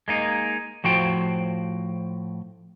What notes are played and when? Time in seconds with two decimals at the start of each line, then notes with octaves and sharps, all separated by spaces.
0.08 G#3 A#3 D#4
0.84 A2 F3 F#4 C5 G5